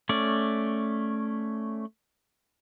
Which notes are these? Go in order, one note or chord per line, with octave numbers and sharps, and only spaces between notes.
A3 C#4 D5